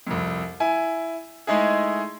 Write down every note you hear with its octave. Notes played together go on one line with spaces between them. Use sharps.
C2 F2
E4 G#5
G#3 A3 D#4 E4 G#4